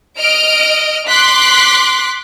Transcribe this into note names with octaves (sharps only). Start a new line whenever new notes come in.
D#5 F6 D7
C6 D6 F#6 B6